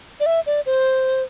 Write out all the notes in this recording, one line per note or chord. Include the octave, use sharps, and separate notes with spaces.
D5
E5
D5
C5